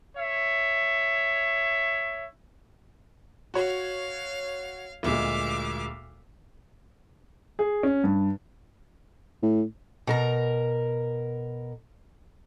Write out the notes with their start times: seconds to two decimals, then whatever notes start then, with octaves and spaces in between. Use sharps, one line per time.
0.17 C#5 E5
3.54 F#4 C#5 F5
5.03 D2 A#2 G#3 E5 F5 D6
7.59 G#4
7.83 C#4
8.04 G2
9.43 A2
10.07 B2 A#4 A#5